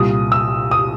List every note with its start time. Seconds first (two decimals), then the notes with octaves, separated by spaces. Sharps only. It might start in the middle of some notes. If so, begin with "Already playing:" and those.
Already playing: C2 A#2 D#6
0.32 E6
0.71 D#6